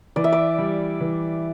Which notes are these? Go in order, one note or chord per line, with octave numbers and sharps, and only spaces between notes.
E3 D5
E5
D5
G3
E3